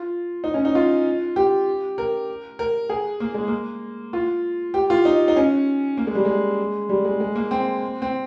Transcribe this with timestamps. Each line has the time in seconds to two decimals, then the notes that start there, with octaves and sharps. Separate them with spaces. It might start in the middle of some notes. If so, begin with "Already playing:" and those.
Already playing: F4
0.44 D#4
0.54 C#4
0.65 D#4
0.75 F4
1.36 G4
1.98 A#4
2.59 A#4
2.90 G#4
3.20 A#3
3.34 G#3
3.48 A#3
4.13 F4
4.74 G4
4.90 F4
5.05 D#4
5.28 D#4
5.37 C#4
5.97 A#3
6.07 G#3
6.15 G3
6.25 G#3
6.89 G3
7.05 G#3
7.20 G#3
7.35 A#3
7.51 C4
8.02 C4